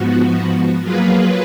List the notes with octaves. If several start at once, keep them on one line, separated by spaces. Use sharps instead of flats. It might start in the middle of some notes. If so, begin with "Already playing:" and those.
Already playing: G#2 F3 B3 F#4
F#3 A#3 F4 G#4 B4